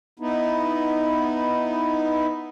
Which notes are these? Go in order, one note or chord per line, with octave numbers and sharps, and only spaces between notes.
B3 D#4 E4